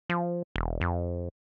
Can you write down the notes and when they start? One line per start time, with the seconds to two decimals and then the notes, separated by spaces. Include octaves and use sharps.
0.09 F3
0.56 E1
0.81 F2